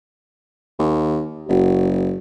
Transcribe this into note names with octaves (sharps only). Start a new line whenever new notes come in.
D#2
F#1 F#4